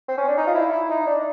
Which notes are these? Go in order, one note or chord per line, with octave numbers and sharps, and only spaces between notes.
C4
C#4
D4
D#4
F4
E4
E4
D#4
D4